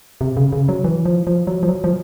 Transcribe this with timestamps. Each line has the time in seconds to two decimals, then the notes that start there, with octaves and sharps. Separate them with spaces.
0.21 C3
0.37 C#3
0.52 C#3
0.69 F#3
0.84 E3
1.05 F3
1.27 F3
1.47 F#3
1.63 F3
1.68 F#3
1.84 F3